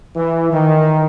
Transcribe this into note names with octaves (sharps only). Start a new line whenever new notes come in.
E3
D#3